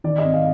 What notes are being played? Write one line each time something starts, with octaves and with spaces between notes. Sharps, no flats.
D#3 D5
G#1 D#5
F5